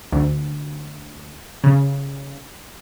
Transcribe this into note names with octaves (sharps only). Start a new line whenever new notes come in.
D2
C#3